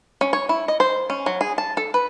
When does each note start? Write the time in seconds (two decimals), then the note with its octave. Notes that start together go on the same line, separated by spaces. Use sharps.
0.21 C#4
0.33 C#5
0.49 E4
0.68 D#5
0.80 C5
1.10 C#4
1.26 F#3
1.41 G#4
1.58 A5
1.77 A4
1.94 B4